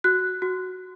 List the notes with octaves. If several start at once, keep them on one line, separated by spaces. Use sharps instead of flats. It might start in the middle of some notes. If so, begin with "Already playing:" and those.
F#4 F#6
F#4